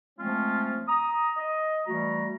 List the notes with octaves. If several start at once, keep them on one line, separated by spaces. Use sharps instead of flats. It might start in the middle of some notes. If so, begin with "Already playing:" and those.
F3 G#3 A3 C4 C#4 F4
A#5 D#6
D#5
E3 G3 A3 F#4 A#5